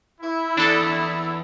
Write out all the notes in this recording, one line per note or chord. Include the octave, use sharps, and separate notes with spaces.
E4
E2 D4 A4